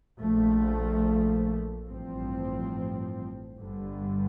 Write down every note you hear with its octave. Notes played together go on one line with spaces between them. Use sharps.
A#1 A#2 F3 A3
A1 G2 F3 C4
G1 G2 D3 G3